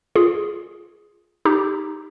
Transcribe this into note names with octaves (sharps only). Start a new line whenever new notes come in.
F4 G#4
D#4 G4